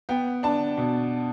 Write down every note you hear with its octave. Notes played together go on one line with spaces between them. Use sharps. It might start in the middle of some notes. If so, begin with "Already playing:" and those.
B3 G5
D4 A5
B2